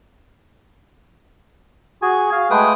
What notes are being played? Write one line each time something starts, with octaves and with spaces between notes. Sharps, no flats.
F#4 G#4 G#5
F5
G#3 A3 B4 G5 D#6